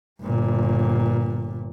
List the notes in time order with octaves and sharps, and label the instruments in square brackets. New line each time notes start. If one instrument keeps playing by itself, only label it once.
[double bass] G1 A#2